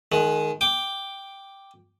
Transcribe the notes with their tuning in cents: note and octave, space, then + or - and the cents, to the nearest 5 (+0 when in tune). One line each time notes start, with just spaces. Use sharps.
D#3 +0 G#3 +30
G5 +0 D6 +0